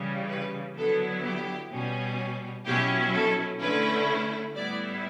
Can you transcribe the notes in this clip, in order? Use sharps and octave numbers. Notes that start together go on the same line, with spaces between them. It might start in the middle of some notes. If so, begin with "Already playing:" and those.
Already playing: C#3 E3 G3 C#4
B4
D3 F#3 B3 E4 A4
G4
B2 G3 C#4
B2 F#3 C#4 E4 G4
A4
D3 A3 C#4 E4 B4
A2 G3 B3 E4 D5